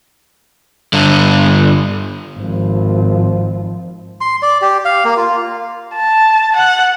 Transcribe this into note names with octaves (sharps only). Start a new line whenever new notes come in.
G2 D3
G#1 F3
C6
D5
G4
F5
A#3
F4
A5
F#5